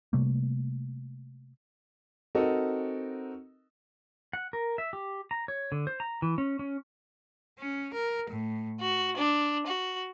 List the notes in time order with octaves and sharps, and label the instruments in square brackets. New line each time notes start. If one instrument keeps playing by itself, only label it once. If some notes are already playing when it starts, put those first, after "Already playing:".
[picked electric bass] C3 G3 A3 A#3
[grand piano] C4 D#4 F#4 A4 A#4 D#5
[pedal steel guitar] F#5
A#4
E5
G4
A#5
C#5
D3
C5
A#5
E3
C#4
C#4
[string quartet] C#4
A#4
A2
F#4
D4
F#4